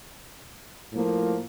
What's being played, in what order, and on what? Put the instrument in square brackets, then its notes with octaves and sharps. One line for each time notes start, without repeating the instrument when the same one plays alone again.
[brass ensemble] A2 F3 A#3